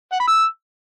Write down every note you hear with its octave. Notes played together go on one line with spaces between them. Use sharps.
F#5
B5
E6